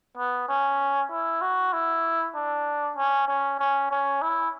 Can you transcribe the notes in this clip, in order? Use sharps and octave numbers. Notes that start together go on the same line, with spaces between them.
B3
C#4
E4
F#4
E4
D4
C#4
C#4
C#4
C#4
E4